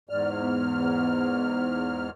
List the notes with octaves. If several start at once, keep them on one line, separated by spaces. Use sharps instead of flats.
E2 G#2 D5 F6
B3